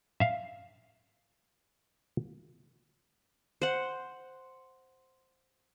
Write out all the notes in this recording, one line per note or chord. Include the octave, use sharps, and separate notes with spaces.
E5 F5
C5 F#5